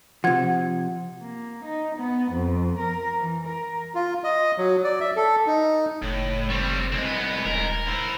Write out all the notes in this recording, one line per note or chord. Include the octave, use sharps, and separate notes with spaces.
C3 F3 F#5 G#6
A#3
D#4
B3
F2
A#4
E3
A#4
F4
D#5
F#3
D5
E5
A4
D#4
F#1 A2
G3 A3 C4
C2 G#3 C4
B3 B4
D#1 A#4
E4 C5